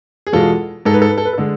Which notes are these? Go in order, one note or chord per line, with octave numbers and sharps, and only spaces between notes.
G#4
E2 B2 G#3 F4 A4
G#2 G#3 A4
B4
A4
B4
A4
B4
A4
D3 G#3